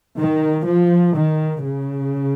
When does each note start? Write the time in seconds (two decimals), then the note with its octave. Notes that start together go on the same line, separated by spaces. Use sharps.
0.17 D#3
0.66 F3
1.14 D#3
1.64 C#3